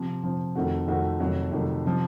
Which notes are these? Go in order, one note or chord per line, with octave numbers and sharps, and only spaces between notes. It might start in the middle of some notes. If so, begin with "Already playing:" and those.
Already playing: C3 F3 C4
C3 F3 C4
F2 D#3 A3 C4 F#4
F2 D#3 A3 C4 F#4
F2 C3 D#3 F#3 A3
F2 C3 D#3 F#3 A3
C3 F3